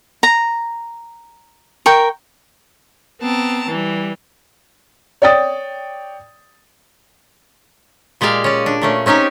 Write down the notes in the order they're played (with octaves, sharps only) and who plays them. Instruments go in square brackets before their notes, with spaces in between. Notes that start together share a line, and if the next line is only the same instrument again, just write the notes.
[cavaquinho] A#5
A#4 G5 C#6
[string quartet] B3 C4 A5 A#5
E3 G3
[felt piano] C#5 D5 G5 D#6 A6
[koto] A#2 G#3 G4 D5 F5
C#4 D5
D4
A#2 A3 C#4
C4 C#4 D#4 G4 G#5